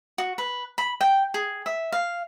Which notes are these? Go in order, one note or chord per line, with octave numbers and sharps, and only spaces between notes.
F#4
B4
B5
G5
G#4
E5
F5